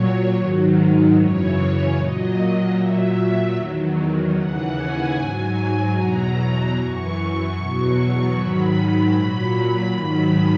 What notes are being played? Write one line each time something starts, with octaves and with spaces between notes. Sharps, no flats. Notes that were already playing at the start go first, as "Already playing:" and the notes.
Already playing: A#2 F#3 C#5
G#2 D#3 F#3
F#2 C#3 E3 C#5
A#2 F#3 D#5
A#2 F#3 E5
E2 D#3 F#3
D#2 C#3 E3 F#5
G#5
G#2 F#3 G#5
E2 B2 F#3 A#5
F#2 E3 C#6
E2 B2 F#3 C#6
G#2 D#3 F#3 B5
A#2 F#3 B5
G#2 D#3 F#3 B5